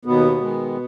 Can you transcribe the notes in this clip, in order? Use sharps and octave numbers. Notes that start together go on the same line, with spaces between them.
D#2 B2 B3
D#3 G#3